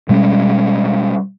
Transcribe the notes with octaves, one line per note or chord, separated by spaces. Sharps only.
B2 G3 G#3 C#4